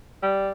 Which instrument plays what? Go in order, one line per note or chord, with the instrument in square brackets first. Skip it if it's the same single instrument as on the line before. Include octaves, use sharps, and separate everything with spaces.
[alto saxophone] G3